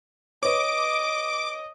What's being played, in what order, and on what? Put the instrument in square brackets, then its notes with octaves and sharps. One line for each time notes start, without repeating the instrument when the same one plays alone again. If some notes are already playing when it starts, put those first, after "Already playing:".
[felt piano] B4 C#5 [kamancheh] D#5 [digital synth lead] D6